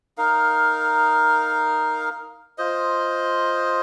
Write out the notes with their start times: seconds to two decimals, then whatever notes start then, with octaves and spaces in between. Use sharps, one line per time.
0.18 D#4 A#4 F5
2.58 F4 C5 D#5